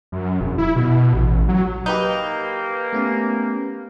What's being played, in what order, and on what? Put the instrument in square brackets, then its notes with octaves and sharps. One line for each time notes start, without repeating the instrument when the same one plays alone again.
[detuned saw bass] F#2
E1
E4
B2
B2
A1
A1
F#3
[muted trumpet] A#3 [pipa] D#4 [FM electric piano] G4 B4 G6
[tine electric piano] A3 B3 C#4